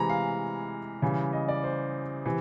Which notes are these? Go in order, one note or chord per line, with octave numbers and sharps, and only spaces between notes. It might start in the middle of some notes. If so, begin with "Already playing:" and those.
Already playing: C3 E3 G#3 A#5 B5
F5
C#3 E3 G3
D#5
D5
C5
C3 E3